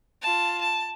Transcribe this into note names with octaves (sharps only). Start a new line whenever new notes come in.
F4 A5
A5